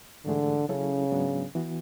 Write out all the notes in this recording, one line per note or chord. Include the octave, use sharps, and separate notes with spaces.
G#2 D3 E3 A3 D4 G#4
C#3 F#3 C#4 E4 A4
G#2 F#3 B3 D4
E3 B3 F#4